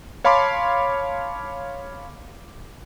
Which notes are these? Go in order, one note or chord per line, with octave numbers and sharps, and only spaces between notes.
C#5 F5 A5 B5 C6 D6